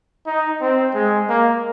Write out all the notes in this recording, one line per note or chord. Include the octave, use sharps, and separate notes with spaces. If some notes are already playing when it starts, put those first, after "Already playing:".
D#4
C4
G#3
A#3